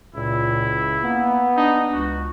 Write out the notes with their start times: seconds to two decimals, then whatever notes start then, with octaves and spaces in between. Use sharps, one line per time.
0.15 C#2 A#2 E4
1.03 A#3 B3
1.56 D4 D#4
1.93 C#2 F#4